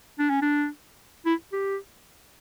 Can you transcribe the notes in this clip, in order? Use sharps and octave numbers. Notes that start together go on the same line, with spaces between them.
D4
C#4
D4
E4
G4